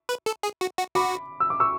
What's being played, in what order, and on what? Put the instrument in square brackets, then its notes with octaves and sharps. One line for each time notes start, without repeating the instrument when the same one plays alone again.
[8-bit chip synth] B4
A4
G#4
F#4
F#4
[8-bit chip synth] F#4 [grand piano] B5 D6
[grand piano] E6
D6
C#6 E6